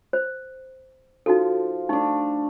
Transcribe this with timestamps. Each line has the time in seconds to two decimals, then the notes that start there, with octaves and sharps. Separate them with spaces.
0.13 C5
1.26 F3 D#4 F4 F#4 A4
1.89 A3 D4 D#4